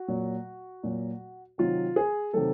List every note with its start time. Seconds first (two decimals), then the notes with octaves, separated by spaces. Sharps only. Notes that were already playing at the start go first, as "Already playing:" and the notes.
Already playing: F#4
0.08 A#2 F#3
0.83 A#2 F#3
1.58 C3 D#3 F#3 F4
1.96 G#4
2.33 C3 D#3 F#3 A4